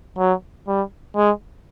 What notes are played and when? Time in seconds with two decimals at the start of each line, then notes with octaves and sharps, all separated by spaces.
0.18 F#3
0.68 G3
1.16 G#3